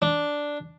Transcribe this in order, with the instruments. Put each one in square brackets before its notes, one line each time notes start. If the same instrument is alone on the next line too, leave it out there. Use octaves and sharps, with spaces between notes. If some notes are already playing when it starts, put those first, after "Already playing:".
[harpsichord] D4